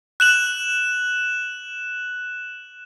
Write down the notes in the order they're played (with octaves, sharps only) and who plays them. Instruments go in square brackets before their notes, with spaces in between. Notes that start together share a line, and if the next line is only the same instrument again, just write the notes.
[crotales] F#6 E7 F#7